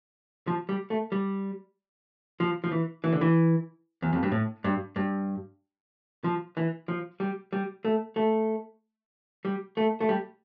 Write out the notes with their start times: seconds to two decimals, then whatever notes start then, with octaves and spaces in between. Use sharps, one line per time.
0.47 F3
0.69 G3
0.90 A3
1.12 G3
2.40 F3
2.64 F3
2.72 E3
3.04 E3
3.13 D3
3.21 E3
4.02 E2
4.13 F2
4.23 G2
4.32 A2
4.64 G2
4.96 G2
6.24 F3
6.57 E3
6.88 F3
7.20 G3
7.52 G3
7.85 A3
8.16 A3
9.45 G3
9.77 A3
10.00 A3
10.09 G3